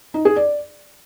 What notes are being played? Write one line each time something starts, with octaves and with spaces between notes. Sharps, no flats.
D#4
G#4
D5